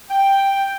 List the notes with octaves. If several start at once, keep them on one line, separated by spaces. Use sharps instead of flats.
G5